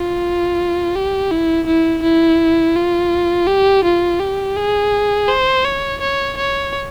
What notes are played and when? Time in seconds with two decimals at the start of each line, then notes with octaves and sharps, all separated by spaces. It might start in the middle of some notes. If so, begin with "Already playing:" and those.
Already playing: F4
0.95 G4
1.32 E4
1.67 E4
2.03 E4
2.75 F4
3.47 G4
3.85 F4
4.20 G4
4.56 G#4
5.28 C5
5.65 C#5
6.01 C#5
6.37 C#5